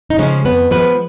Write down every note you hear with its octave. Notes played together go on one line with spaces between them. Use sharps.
D#4
C#3 F3 G#3 C#4
F2 B3 B4
F3 G#3 B3 B4